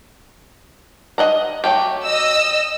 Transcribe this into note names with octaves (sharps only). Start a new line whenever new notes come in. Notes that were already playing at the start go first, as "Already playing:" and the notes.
D#5 F#5 A#5
F#3 A3 G4
D#5 E6